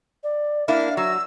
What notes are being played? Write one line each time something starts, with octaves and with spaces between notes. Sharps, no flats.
D5
A#3 D4 E4 E5 F5
F#3 E6